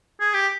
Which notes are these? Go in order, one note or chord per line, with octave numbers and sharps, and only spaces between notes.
G#4
G4